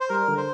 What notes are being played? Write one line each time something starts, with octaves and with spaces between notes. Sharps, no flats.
C5
G3 A#4
D3
C5